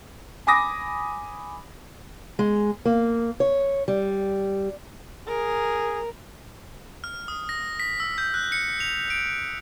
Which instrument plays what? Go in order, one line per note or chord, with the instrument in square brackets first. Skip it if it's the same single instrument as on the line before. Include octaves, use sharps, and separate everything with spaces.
[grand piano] G#5 B5 D6 D#6 A#6
[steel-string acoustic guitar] G#3
A#3
C#5
G3
[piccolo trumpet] G#4 [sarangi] A#4
[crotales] F6
D#6
A#6
B6
E6
G6
F#6
C#7
F7
D7